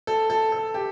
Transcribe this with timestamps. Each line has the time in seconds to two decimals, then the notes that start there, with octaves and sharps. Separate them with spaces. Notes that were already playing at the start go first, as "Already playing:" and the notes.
0.07 A4
0.30 A4
0.52 A4
0.74 G4